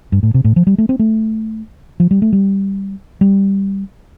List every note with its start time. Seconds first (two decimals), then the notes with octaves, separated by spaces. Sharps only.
0.12 G2
0.23 A2
0.34 C3
0.44 A2
0.56 F3
0.67 G3
0.78 A3
0.89 C4
0.99 A3
2.00 F3
2.11 G3
2.22 A3
2.33 G3
3.21 G3